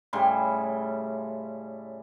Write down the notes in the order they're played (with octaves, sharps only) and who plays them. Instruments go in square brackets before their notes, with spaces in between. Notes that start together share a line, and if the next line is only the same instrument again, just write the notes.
[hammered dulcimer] A2 C#3 G3 C6